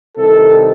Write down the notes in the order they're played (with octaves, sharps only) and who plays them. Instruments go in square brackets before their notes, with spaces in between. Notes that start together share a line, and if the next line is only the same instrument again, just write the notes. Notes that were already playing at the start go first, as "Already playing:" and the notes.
[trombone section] C2 C3 D#3 A4